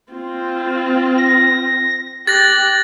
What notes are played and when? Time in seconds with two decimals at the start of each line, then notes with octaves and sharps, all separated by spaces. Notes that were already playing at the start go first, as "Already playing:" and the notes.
0.13 C4 F4
1.18 A#6
2.27 G4 F#6 A6 A#6